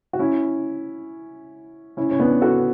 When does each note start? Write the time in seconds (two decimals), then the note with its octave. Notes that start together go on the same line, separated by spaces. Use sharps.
0.13 F#4
0.19 C#4 E4
1.97 C#4 E4
2.11 C#4
2.20 B3 D4
2.41 F#4 A4